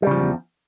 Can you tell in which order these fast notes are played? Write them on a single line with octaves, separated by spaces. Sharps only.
G3 C#3 F3 G#2 E2